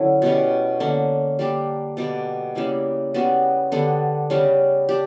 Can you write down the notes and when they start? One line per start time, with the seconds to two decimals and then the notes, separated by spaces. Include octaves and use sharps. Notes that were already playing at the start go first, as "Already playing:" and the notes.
Already playing: D3 F#3 C#4 E4
0.22 B2 G3 C#4
0.80 D3 A#3 C#4
1.39 G3 A#3 D4 G4
1.97 B2 G3 A#3 D4
2.55 C#3 G3 A#3 E4
3.14 C#3 G3 B3 F#4
3.72 D3 G3 B3 D4
4.30 C#3 G3 C#4
4.89 D4 G4